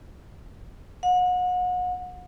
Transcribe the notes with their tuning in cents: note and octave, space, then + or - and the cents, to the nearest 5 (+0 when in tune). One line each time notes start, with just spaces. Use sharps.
F#5 -35